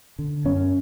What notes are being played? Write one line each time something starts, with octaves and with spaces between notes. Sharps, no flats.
D3
F#2 C#4